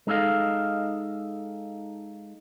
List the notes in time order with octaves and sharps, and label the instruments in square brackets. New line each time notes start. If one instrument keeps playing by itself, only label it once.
[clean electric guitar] G#3 D#4 A4 D#5 F5